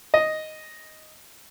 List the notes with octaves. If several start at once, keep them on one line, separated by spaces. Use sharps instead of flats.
D#5